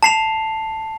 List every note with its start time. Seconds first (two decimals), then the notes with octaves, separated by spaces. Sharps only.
0.03 A5 C7 F7